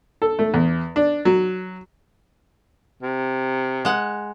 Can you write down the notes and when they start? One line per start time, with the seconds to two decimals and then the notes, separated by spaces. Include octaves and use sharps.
0.22 A4
0.39 A3
0.54 E2
0.96 D4
1.25 F#3
3.03 C3
3.85 G#3 F#5